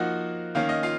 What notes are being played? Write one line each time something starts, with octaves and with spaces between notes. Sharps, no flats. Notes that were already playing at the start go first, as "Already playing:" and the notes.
Already playing: F3 A#3 D#4 F#4 F#5
D#3 A#3 C#4 F5
D#5
F4 F5